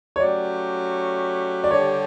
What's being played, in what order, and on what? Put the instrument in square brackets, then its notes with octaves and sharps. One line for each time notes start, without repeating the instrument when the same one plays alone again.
[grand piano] C#5
[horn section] F#3 A3 C#4 G4 [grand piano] D5
[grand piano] D5
[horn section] D3 G3 D4 G4 [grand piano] C#5